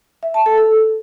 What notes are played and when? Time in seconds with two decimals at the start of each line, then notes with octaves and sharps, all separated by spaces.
0.23 E5
0.34 A5
0.46 A4
0.58 A4